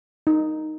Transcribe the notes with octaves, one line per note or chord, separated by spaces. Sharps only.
D#4